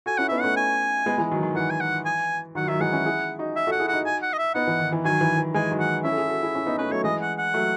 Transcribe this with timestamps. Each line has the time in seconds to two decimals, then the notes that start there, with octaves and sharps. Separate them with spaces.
0.06 F#4 A4 G#5
0.18 C#4 E4 F#5
0.29 B3 D#4 E5
0.41 A3 C#4 F#5
0.56 G#5
1.06 G#3 B3
1.18 E3 G#3
1.31 D#3 F#3
1.43 D#3
1.56 E3 F#5
1.70 G#5
1.80 F#5
2.05 G#5
2.55 D#3 F#3 F#5
2.68 D#3 F#3 E5
2.80 E3 G#3 F#5
2.93 C#4 E4
3.05 E4 G#4
3.39 D#4 F#4
3.56 E5
3.67 F#4 A4 F#5
3.80 E4 G#4
3.88 F#5
3.93 D#4 F#4
4.05 G#5
4.22 F#5
4.33 D#5
4.38 E5
4.54 B3 D#4 F#5
4.67 E3
4.79 D#3
4.92 E3
5.04 D#3 F#3 G#5
5.21 E3
5.38 E3
5.54 E3 G#3 G#5
5.71 D#3 F#3
5.80 F#5
6.04 C#4 E4 E5
6.12 A4
6.17 E4 G#4
6.29 F#4 A4
6.42 E4 G#4
6.55 C#4 E4
6.66 B3 D#4
6.78 A3 C#4 B4
6.91 F#3 A3 C#5
7.04 E3 G#3 D#5
7.22 F#5
7.38 F#5
7.54 F#3 A3